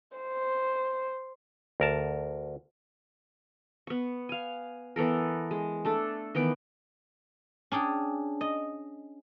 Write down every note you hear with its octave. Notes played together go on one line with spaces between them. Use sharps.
C5
D2 A#4 A5
B3 C#6
F5 G#5
E3 B3 A4 A#4
G#3
A3 D4 A4
D#3 E3 B3 D6
C#4 D4 G#4 G5
D#5